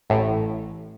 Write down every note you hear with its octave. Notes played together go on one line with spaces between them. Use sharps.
A1 A2